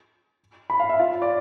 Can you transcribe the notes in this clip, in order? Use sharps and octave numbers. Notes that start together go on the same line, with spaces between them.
B5
F5
E5
F4
D5